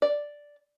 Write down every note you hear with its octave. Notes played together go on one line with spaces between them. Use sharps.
D5